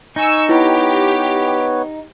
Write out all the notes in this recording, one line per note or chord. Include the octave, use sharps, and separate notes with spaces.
D#4 G#5 C#6 E6
B3 E4 G4 B4 C#5